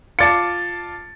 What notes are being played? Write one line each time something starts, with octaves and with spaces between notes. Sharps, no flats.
F4 D5 A5 A6 C#7